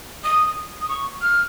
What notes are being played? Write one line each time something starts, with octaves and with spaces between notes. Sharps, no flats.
D#6
D#6
C#6
F6